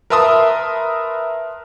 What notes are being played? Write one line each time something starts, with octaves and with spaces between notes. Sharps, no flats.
A#4 B4 E5 A5 C6 D#6